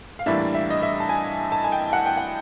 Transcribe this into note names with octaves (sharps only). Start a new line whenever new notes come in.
F5
A2 E3 G3 A#3 D4 E5
E5
D#5
E5
A5
G#5
A5
G#5
G5
F#5
G5
F#5